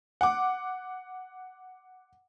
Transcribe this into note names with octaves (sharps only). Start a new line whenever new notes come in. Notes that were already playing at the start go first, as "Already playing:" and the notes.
F#5 D6